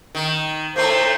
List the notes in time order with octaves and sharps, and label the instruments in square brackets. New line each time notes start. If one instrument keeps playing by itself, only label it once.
[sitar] D#3
[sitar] A2 A3 A#3 [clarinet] C5